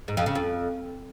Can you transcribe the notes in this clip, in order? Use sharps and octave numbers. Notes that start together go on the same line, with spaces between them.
G#2
F2
C#3
F2